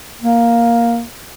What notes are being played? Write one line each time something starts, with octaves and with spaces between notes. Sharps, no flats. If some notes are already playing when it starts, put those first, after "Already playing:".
A#3